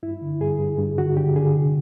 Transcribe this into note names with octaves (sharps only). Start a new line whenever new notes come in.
G2 E4
D3
G2 G#4
G2
G2
D3 F#4
D3 G4
D3 G#4
C3